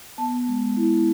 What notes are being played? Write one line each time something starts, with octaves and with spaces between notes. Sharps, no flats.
B3 A5
G#3
E4